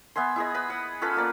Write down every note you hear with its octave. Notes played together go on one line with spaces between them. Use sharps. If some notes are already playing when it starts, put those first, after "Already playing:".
B3 E5 G#5 C6
E4 G#4 D#5
B4 B5
F#5
C#4 F4 A4 B4
A#3 D5